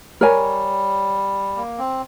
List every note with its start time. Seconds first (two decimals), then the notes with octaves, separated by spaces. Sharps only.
0.21 G3 A#4 C#5 G#5
1.56 A#3
1.79 C4